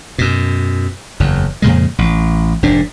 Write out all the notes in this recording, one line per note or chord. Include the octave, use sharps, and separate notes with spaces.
F#2 B2
F#1 E2
F2 A#2 C#3 G#3
A1
F1 G#2 D4